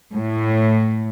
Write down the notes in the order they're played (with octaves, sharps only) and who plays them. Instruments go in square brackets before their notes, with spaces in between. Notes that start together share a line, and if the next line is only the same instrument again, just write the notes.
[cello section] A2